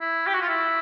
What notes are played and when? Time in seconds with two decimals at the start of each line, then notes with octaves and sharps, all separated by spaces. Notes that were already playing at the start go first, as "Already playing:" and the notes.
0.01 E4
0.27 G4
0.34 F#4
0.41 F4
0.49 E4